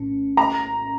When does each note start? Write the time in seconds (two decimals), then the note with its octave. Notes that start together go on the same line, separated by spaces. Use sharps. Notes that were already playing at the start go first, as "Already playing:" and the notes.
Already playing: A#1 A2 C#4
0.37 A#5